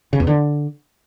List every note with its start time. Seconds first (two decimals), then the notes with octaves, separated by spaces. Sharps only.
0.13 C#3
0.20 E2
0.27 D3